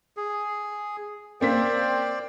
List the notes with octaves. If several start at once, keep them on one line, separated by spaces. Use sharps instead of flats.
G#4
A#3 C4 C5 D5 G5 B6